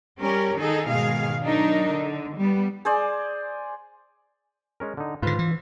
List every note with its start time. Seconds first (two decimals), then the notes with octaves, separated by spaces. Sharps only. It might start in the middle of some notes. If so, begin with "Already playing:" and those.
0.21 G3 C#4 G4 A#4
0.57 D#3 D#4 G#4 A4
0.88 G#2 B2 D#3 G#4 F5
1.44 F#3 D4 D#4 A#4
1.92 D3
2.38 G3 B3
2.85 G#4 C5 D5
4.80 G#3 C#4 A#4
4.97 D3 D#4
5.22 G#2 D3 F4 B4 C5
5.39 E3